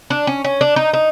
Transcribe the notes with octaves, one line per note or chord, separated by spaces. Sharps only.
D4
C#4
C#4
D4
D#4
D#4